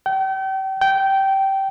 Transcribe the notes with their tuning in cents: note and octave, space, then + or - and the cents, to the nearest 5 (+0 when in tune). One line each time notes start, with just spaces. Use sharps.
G5 -35
G5 -15